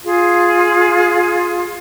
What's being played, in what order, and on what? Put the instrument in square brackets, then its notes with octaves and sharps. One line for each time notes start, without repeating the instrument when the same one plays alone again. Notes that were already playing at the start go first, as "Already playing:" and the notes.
[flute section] F4 G#4